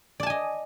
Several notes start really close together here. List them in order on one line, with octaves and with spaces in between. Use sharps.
D5 A5 G#5 D#5